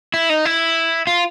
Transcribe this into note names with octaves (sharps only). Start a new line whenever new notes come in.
E4
D#4
E4
F4